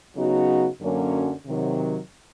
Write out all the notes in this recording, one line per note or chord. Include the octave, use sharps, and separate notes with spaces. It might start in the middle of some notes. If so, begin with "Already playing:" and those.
C#3 F#3 B3 D#4 F#4
F#2 D3 F#3 A#3 C#4
C3 D#3 F#3